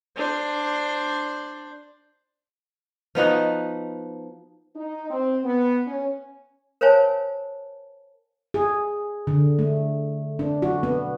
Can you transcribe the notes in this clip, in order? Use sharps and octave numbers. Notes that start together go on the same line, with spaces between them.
D4 C5
F3 B3 D#4 F#4
D#4
C4
B3
C#4
A#4 C5 C#5 F5 G#5 A5
G#4
D3
A3
D4
F#4
B3